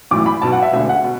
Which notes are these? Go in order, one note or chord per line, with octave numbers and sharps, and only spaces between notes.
B1 A2 E3 D6
B5
B1 B2 A5
F#5
E5
E1 D2 D3 E5
F#5
B2